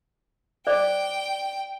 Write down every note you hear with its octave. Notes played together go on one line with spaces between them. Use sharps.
C5 D5 G5 D6